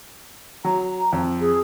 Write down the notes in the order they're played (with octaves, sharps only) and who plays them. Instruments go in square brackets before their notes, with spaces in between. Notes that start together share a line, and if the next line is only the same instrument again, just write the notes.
[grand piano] F#3 [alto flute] A#5
[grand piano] F2
[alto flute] G#4